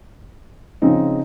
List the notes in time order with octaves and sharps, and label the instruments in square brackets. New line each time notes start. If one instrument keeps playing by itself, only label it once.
[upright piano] C#3 F3 C4 D#4